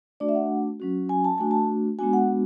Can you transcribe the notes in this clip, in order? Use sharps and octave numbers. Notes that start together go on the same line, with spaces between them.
A3 D4 F#4 D5
E5
F#5
F#3 C#4 F#4
G#5
A5
A3 D4 F#4 G#5
A5
G#3 B3 D4 F#4 G#5
F#5